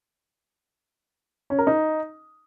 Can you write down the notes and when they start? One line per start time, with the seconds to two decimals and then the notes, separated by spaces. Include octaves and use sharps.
1.50 C#4
1.59 A#4
1.67 D#4